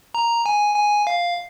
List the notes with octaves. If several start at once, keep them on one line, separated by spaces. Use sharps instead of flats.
A#5
G#5
G#5
F5